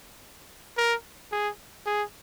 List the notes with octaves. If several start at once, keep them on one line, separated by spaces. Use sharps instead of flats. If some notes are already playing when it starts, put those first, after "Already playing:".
A#4
G#4
G#4